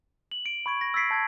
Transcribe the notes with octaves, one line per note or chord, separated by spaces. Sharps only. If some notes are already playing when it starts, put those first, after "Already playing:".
F#7
D7
B5 C#6 G#6 D7
A#6
E6 G#6 A6 B6 C7 D7
A5 G6 G#6